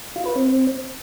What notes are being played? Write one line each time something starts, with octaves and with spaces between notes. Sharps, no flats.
F4
B4
C4